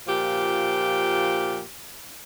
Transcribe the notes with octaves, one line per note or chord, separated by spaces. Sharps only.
A#2 F3 G4